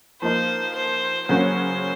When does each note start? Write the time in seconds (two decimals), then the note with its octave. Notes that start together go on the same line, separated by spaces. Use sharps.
0.22 F3 A#3 D#4 C5
0.75 C5
1.29 C#3 F#3 A#3 C#4 F#4 C5